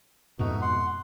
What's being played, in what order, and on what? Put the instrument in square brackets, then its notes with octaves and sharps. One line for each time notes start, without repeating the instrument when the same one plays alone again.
[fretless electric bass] F2 G#2 B2 [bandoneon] A3 D#4 F#4
[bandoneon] F#5 C6